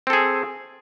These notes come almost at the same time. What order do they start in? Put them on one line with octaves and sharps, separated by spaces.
C4 A4 G#4